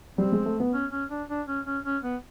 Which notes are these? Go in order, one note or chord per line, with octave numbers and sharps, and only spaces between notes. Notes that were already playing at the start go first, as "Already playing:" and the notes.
G3 C4
G#3
A3
B3
C#4
C#4
D4
D4
C#4
C#4
C#4
B3